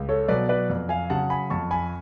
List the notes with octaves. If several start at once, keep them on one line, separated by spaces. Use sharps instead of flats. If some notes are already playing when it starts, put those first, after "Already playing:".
Already playing: C#2
A4 C#5
B2 F#3 B4 D5
B4 D5
F2
F5 G#5
C#3 F#3 F#5 A5
G#5 B5
F2 A5 C#6
G#5 B5